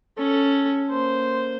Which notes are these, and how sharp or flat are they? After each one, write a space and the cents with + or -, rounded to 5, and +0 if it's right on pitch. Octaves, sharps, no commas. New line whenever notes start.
C#4 +0 A4 +0
A#3 +0 C5 -10